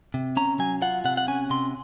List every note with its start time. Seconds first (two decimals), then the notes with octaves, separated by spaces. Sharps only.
0.14 C3
0.37 C#4 A#5
0.59 F#3 G#5
0.82 F4 F#5
1.05 C3 F#5
1.17 F#5
1.28 C#4 G#5
1.50 C3 C6